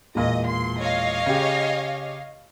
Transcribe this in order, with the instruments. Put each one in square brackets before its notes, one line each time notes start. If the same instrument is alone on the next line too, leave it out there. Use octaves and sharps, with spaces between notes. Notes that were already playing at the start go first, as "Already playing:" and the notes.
[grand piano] E1 A#2 [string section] D#5
[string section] C6
C#5 D#5 F5
[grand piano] C#3 G4